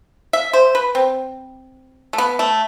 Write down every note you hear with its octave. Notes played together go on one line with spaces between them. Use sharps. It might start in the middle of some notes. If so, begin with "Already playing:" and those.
E5
C5
B4
C4
A3
B3
A3